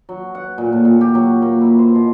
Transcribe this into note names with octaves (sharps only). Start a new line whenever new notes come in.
F#3
F#5
A#2
A2
A#2
G4
F#3
A#3
E4
C5
B2